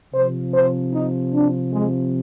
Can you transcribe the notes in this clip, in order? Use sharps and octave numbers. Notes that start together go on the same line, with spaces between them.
C3 F3 C5
C5
D#4
D4
G#3